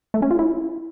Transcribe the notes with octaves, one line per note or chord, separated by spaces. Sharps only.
A3
C#4
F4
E4